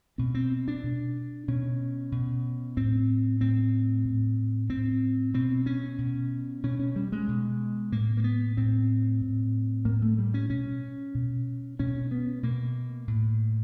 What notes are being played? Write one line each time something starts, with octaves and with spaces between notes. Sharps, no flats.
B2 C4
C4
D4
B2
B2 C#4
B2
A2 C4
A2 C4
A2
A2 C4
B2 C4
C#4
B2
B2 C#4
C#4
G3
G#3
B2
A2 A#3
A#3
B3
A2 C4
A2
A2 A#3
A3
G3
C#4
B2 C#4
B2
B2 C#4
B3
B2 A#3
A2